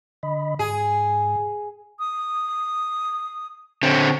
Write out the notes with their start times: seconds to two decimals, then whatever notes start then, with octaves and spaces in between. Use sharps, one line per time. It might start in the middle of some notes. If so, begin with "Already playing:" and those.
0.23 D3 D#5 B5
0.59 G#2 G#4
1.99 D#6
3.83 D3 C4 C#4